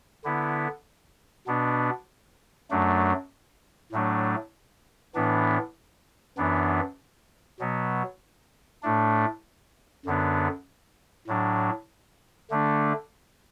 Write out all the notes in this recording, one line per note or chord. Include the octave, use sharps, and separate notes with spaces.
D3 B3 E4
B2 B3 D4
F#2 F#3 A3 D4
A2 F#3 A3 D4
A2 E3 B3 D4
F#2 E3 B3 D4
B2 F#3 B3
A2 A3 D4
F#2 D3 B3 D4
A2 F#3 D4
D3 A3 D4